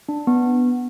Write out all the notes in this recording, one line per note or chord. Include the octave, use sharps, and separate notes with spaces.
D4
B3